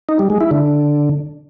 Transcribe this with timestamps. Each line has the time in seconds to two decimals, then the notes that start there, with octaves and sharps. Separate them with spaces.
0.09 D#4
0.19 G3
0.30 G#3
0.41 E4
0.51 D3